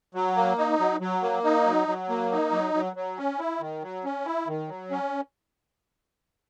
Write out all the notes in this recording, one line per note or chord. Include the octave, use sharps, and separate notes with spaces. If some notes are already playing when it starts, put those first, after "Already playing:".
F#3
A#3
D#4
F#3
F#3
A#3
D#4
F#3
F#3
A#3
D#4
F#3
F#3
F#3
C#4
E4
D#3
F#3
C#4
E4
D#3
F#3
C#4